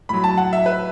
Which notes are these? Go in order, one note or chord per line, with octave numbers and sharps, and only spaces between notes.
A2 F#3 B5
A5
F#5
E5
B4